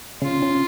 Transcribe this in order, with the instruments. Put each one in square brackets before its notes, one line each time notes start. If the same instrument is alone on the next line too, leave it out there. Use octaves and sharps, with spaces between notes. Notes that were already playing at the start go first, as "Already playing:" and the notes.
[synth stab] C#3 [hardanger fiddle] F4
[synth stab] C#3